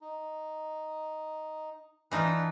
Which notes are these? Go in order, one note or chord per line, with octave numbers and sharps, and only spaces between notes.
D#4
E3 D4 D#4 F4 B4 E6